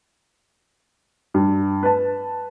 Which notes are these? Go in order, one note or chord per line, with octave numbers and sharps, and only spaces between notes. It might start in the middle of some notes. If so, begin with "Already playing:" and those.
G2
B4 A5